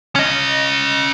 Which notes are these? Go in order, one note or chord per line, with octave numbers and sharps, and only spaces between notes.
C#4 D#5